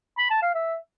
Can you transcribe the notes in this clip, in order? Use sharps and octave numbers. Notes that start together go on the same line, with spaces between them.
B5
A5
F5
E5